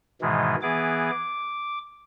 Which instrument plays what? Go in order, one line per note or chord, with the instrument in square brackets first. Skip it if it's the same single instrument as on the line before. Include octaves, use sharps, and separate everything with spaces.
[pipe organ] G#2 B2 D#3 E3 G#3
E3 B3 G#4 D6
D6